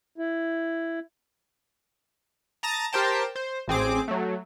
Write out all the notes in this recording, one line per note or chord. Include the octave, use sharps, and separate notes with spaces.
E4
A5 A#5 D#6 A6 A#6
G4 A#4 C5 G5 A5
C5
A1 C4 G#4 D6
F#3 A3